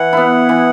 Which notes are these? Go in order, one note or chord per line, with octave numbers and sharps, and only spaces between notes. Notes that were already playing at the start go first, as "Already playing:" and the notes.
Already playing: E3 F#5
B3 E4
E3